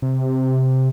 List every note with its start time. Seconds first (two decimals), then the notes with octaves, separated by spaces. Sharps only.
0.02 C3